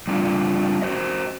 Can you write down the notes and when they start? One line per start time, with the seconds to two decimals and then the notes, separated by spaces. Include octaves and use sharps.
0.07 G3 C4 D4 F4
0.82 F#4 C5 D#5